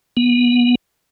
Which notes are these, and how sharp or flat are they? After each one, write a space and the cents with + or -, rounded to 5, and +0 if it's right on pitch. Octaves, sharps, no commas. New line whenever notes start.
B3 -25